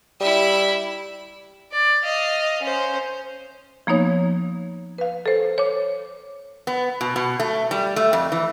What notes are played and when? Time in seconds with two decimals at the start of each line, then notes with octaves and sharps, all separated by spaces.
0.20 G3 E4 E5
1.72 D5
2.03 D#5 F5
2.62 C#4 C5
3.87 F3 A#3 B3 D#4 C#5
4.98 B4 F5
5.26 A4 C5
5.58 C#5 D6
6.67 B3
7.01 B2
7.16 B2
7.40 A3
7.71 G3
7.96 A3
8.13 F2
8.32 E3